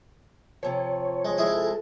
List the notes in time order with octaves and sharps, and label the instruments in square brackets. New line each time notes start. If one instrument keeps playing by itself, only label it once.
[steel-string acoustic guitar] C3 F3 [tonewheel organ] C#5
[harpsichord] G#3
G#3 E4 G#4
[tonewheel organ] A4